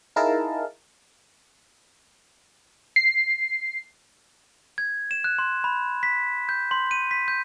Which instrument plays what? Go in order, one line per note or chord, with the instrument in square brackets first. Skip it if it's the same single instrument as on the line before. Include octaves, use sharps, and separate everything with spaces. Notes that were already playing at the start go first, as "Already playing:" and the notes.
[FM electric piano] D#4 E4 G#4 A#4 F5 A5
C7
[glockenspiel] G#6
E7
F#6
C6
B5
B6
G6
C6
D#7
B6
G6